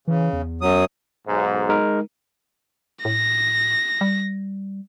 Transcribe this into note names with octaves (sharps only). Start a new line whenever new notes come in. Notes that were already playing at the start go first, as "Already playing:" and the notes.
C#3 E3
E2
F#2 F#3 D#6
B1 G#2
G#3 D#4 A#4
A2 A#6
G3